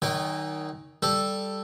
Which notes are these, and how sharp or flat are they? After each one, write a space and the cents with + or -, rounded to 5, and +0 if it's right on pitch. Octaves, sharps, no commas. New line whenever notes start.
D#3 +0 F#3 +35 G#5 -35
G3 +0 A4 +0